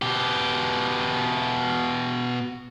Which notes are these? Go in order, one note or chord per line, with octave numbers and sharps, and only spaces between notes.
B2 G4